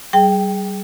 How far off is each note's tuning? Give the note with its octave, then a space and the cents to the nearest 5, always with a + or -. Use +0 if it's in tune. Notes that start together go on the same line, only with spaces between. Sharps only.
G3 -25 G#4 +0 G5 +0